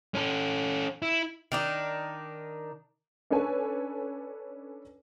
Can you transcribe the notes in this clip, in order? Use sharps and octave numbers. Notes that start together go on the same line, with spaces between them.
C#4 A4
E4
D#3 D4 D#4
C#4 D4 A4 B4 C#5 G#5